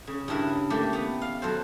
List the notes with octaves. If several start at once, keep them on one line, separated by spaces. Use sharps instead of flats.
C#3
G2 C#3 E4 A#4
A3 A#3 G4
B3
F5
F#3 A4 C5